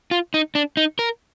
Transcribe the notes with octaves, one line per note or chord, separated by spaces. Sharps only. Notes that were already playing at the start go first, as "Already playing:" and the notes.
F4
D#4
D4
D#4
A#4